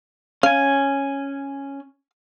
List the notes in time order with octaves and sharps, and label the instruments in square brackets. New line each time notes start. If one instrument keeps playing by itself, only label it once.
[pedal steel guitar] C#4 G#5 [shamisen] F5